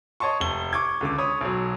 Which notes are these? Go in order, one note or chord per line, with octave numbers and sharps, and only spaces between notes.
C#5 D#5 A5 C6 C#6
F1 G7
C#6 D6 G#6
C#2 D3 D6
C#5 B5 D#6
B1 F#3